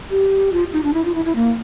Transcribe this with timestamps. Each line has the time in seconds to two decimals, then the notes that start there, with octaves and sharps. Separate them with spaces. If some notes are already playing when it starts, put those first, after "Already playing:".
0.11 G4
0.53 F4
0.73 D#4
0.84 D4
0.94 E4
1.05 F4
1.15 E4
1.25 E4
1.35 A#3